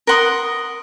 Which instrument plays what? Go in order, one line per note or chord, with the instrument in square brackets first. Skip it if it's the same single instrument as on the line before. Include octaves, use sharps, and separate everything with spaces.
[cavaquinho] A#4 F#5 C6 D#6